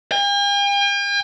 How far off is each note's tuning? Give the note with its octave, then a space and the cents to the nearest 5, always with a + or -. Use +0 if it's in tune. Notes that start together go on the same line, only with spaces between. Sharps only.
G5 +45